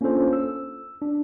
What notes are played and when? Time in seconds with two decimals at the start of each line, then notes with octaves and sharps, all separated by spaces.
0.01 A#3 C#4 D4 F4 A4 C5
0.33 E6
1.02 D4